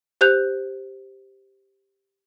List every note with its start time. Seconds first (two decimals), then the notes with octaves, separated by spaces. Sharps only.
0.21 G4 C5 F#6 G6 F7